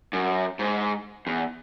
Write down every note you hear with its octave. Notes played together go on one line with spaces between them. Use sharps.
F#2
G#2
E2